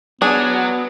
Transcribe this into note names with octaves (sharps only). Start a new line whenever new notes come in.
F#3 B3 D4 G#4